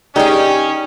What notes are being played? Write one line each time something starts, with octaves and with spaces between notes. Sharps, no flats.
C#4 D#4 G4 G#4 A#4 D5 D#5